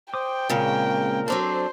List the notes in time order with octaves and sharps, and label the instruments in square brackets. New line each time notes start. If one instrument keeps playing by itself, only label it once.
[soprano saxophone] C5 [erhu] G5 [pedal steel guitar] D6 D#6
[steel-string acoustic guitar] A#2 C#3 [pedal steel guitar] G#3 C4 C#4 [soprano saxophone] A#4
[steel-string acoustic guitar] F#3 C4 D4 [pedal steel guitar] A4 D6 [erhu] C5